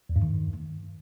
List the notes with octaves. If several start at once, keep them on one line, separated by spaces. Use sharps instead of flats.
E2
G2
D#3